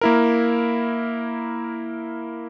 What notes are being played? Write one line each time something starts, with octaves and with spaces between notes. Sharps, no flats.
A#3 E4 A#4